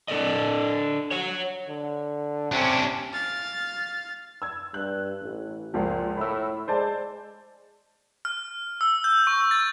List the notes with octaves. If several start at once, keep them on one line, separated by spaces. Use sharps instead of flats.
D4 A4 D5 D#5
C#5 F#5
D3
C3 C#4 D4
F5 A6
E6 G#6
G2 F#6
A1
C#2 A#2 F3
A2 B5 E6
G#3 C5 D5 A5
F6
E6
G6
C#6
A6